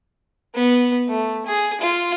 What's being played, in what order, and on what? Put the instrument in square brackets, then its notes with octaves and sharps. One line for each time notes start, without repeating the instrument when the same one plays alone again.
[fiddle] B3
A3
G#4
F4